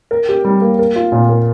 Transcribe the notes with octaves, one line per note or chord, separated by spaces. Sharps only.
A#4
G4
G3
A#3
A#4
F4
A#2
A#3